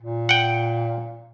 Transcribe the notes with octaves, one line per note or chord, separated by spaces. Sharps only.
A#2
F#5 G5